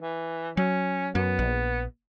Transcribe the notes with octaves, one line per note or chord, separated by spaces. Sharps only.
E3
F#3 C#4
F#2 B3
A#1